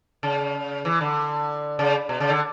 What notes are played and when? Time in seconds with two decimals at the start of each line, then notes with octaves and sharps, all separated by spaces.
0.23 C#3
0.85 E3
1.01 D3
1.79 C#3
2.09 B2
2.20 C#3
2.30 D3